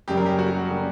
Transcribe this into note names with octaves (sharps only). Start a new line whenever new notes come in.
F#2 C#3 G3 G4
A#4
G4
F#4
C#3 G3